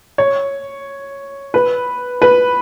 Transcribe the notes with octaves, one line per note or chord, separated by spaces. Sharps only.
C#5
B4
B4